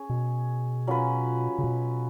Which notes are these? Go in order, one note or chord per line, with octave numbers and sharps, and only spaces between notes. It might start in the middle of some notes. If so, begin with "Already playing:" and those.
Already playing: C#4 G#4 C#5
B2
F#3 C#4 F4 B4
C#3
B2